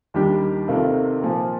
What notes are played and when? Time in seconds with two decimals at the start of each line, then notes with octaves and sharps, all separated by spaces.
0.14 D#2 D#3 G3 D4 G4
0.68 C3 D#3 A#3 F4 A4
1.23 A#2 F3 A#3